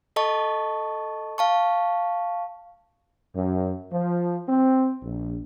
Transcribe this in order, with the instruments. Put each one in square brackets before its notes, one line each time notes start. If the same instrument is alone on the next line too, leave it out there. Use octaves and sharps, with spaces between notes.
[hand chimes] A4 D#5 A5 C#6
F5 A5 C#6
[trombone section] F#2
F3
C4
A#1